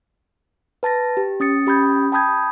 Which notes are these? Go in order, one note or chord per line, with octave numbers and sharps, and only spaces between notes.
B4 A5 A6 A#6
G4
C#4 D#6 A6 C#7
C#4 G4 B5 D#6 G6 G#6
G5 A5 B5 D#6 G6 G#6